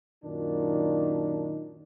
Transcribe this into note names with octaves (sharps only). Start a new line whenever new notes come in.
F#2 A#2 D#3 D4 D#4